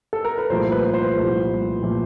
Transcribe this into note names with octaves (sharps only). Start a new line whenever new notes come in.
A4
A#4
B4
C2 A#2 F3 A3 C5
B4
C5
C2 A#2 F3 A3
A#2 F3 A3